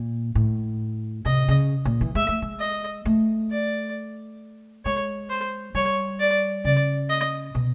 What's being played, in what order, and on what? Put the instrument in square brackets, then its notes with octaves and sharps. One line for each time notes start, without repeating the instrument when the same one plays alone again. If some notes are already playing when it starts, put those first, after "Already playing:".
Already playing: [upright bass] A#2
A2
[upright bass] C3 [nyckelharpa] D#5
[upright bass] C#3
A#2
E3
[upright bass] G#3 [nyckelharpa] E5
[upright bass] A3
G#3
[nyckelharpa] D#5
[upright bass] A3
[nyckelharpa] D5
[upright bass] G#3 [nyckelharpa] C#5
[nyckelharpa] C5
[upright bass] G3 [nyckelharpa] C#5
[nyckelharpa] D5
[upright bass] C#3 [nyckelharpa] D5
[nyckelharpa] D#5
[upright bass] B2